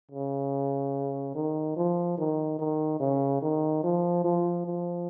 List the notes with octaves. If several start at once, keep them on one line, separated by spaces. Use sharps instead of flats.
C#3
D#3
F3
D#3
D#3
C#3
D#3
F3
F3
F3